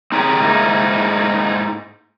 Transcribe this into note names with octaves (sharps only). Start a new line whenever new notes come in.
C4 D#4 G4 G#4 C#5 G5
G#2 A#3 D#4 E4